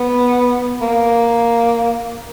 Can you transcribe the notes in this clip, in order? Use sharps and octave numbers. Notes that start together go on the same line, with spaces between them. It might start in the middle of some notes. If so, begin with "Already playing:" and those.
Already playing: B3
A#3